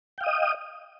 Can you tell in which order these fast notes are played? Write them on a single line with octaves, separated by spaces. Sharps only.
G5 F5 D#6 D#5